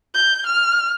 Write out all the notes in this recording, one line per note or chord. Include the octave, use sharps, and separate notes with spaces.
G6
F6